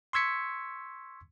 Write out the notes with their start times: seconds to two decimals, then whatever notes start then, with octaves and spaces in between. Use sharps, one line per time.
0.13 C6 C#6 E6 G#6 B6 C#7